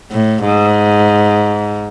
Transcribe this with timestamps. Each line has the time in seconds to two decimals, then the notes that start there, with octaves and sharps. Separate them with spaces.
0.11 A2
0.44 G#2